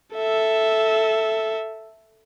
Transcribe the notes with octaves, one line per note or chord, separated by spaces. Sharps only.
A4 E5